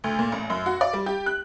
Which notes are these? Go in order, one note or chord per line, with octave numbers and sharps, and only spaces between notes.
D2
A#2
A1
F#2
F#4
D5
G3
G4
F#6